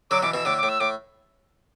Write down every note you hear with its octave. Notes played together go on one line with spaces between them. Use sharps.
D3 F#3 D6
B2 E3 D6
B2 E3 E6
A2 D3 D6
D6
A2
E6
A2 D6